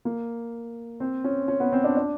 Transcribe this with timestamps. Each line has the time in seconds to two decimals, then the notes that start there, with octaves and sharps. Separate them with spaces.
0.05 A#3
1.00 C4
1.24 C#4
1.48 C#4
1.60 B3
1.72 C4
1.84 D4
1.97 D4